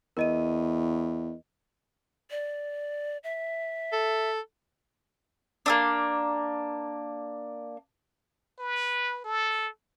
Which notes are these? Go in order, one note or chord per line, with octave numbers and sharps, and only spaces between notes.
E2 A#4 D#5 D#7
D5
E5
A4
A#3 C4 D4
B4
A4